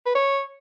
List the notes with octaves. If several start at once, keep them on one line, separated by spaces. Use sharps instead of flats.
B4
C#5